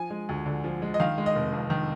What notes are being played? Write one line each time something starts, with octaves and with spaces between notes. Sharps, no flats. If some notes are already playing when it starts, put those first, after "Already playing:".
Already playing: F3 G#5
G#3
D2
D3
F3
G#3
D#5
D#3 F5
G#3
D#5
F1
F2
D#3